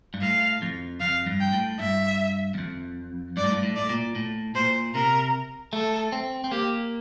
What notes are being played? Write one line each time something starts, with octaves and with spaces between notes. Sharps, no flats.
G2
A2 F5
F2
F2 F5
G2
G5
A2
G2 E5
E2
F2
G2 D5
A2
G2
A2
A2 D5
A#2
A2
A#2 C5
C3 A#4
A3 A4
C4
C4
A#3 G4